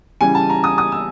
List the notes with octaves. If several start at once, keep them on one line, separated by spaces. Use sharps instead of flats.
C#3 E3 G3 G#5
A5
A#5
D#6
D#6
E6